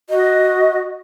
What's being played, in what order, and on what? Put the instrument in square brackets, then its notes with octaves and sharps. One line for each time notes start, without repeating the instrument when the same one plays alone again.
[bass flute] F#4 [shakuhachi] D#5